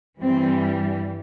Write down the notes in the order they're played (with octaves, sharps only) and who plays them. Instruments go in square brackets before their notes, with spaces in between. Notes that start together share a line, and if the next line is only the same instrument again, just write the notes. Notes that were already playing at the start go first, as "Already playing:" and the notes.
[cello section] G2 E3 G3 C4